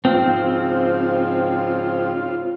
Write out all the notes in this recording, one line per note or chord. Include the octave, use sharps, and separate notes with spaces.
G#2 C#3 F3 C4 F4